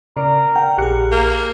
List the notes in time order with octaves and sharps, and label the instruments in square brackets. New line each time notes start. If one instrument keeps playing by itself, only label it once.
[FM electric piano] C#3 [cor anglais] A#4 [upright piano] D5
[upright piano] F#5 [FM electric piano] G5
[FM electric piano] A#1 G#4 [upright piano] G4 F#6 C#7
[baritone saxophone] A#3 [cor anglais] F5